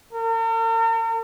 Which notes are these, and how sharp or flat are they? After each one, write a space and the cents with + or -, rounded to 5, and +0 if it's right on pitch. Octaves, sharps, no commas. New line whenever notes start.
A#4 -45